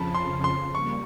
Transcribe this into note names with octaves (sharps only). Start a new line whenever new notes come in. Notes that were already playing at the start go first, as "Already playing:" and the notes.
Already playing: F2 C#3 F3 A5 B5
C6
C6
G3 A#3 C#6